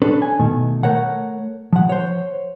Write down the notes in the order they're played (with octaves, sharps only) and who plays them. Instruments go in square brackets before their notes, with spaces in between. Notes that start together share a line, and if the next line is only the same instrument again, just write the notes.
[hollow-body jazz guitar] C#4 D4 A4 B4
G#5
B2 D#3 A3
A3 A#4 C#5 F#5
F3 F#5
C5 C#5